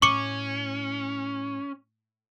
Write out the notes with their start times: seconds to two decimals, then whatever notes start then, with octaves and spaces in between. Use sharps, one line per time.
0.02 A2 C#4 C#6 D6 C#7